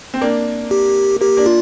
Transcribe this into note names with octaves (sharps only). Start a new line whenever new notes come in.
C4
A#3 D4
G4
A#3 G4
A#3 D4
F4